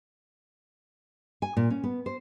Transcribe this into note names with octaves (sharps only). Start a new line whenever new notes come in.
G#5
A#2
C#4
B3
C5